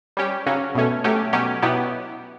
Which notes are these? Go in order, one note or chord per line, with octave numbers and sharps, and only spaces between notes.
G3 C#4 G4
C#3 F#3 C#4
B2 A3 C#4
F#3 A3 C#4 G4
B2 F#3 C#4 G4
B2 F#3 B3 E4 G4